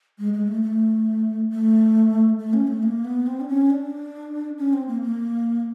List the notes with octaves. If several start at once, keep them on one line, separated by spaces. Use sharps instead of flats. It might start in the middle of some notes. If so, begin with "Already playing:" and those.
G#3
G#3
A3
A3
A3
A3
C#4
A3
A#3
B3
C4
D4
C#4
D4
C#4
C4
A#3
A#3